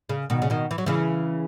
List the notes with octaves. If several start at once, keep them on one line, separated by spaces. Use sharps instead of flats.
C#3
B2 D#3
C#3
B2 D#3
E3
F#3
C#3 E3